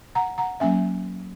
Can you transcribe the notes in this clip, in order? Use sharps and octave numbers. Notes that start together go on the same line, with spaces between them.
F#5 A#5
F#5 A#5
F#3 A#3 C#4 E5 G#5